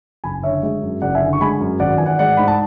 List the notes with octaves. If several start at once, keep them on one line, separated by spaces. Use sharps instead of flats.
F#1 G#5 B5
D3 C#5 E5
G#3
F#2
F#1 D5 F#5
E5 G#5
D3
C#6
G#3 G#5 B5
F#2
G#1 D5 F#5
E3 G#5
D5 F#5
G#3 D5 F#5
G#2 B5
A5